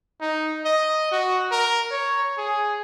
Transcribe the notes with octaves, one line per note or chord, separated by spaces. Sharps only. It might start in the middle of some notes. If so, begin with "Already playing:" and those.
D#4
D#5
F#4
A#4
C#5
G#4